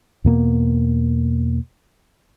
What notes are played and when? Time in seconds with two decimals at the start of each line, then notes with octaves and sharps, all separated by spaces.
0.24 E2 B2 A#3 B3